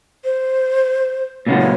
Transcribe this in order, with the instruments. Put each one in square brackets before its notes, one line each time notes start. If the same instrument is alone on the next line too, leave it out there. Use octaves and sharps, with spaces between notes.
[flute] C5
[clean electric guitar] A#2 C#3 F#3
[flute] C#5